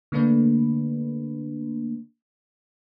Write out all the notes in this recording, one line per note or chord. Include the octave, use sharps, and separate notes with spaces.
D3 A3 A#3 D4 B4